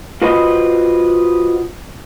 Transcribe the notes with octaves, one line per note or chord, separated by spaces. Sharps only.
F4 F#4 B4 C5 D#5